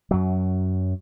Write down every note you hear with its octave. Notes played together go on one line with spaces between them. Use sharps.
F#2 F#3